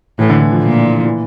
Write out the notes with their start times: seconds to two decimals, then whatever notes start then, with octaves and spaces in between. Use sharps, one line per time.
0.19 A2 E3
0.30 D3
0.40 E3
0.52 F3
0.62 A#2
0.99 F3
1.05 E3